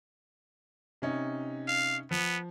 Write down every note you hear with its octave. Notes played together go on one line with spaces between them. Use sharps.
C3 C#4 D#4
F5
F3 B3